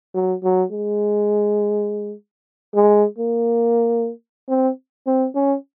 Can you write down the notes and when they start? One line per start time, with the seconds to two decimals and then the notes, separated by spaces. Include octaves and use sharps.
0.14 F#3
0.44 F#3
0.72 G#3
2.75 G#3
3.19 A#3
4.49 C4
5.07 C4
5.35 C#4